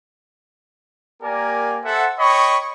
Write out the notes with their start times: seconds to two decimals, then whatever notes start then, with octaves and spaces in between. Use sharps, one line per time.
1.23 A#3 G4 A#4 D5 G#5
1.84 A4 C5 E5 F#5
2.19 C#5 D#5 G5 B5 C#6